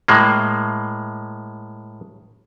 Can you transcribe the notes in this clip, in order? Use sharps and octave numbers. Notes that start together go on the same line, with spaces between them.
A2 G#3 A#3